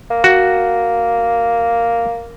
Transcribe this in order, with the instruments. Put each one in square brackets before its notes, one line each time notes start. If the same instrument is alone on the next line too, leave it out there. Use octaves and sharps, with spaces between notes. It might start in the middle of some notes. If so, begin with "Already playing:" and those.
[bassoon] A#3
[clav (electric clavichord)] F#4